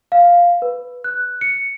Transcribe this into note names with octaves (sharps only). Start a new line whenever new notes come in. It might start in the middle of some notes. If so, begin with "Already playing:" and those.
F5
B4
F#6
C#7